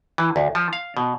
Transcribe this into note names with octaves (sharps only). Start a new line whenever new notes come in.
E3
D2
F3
F5
B2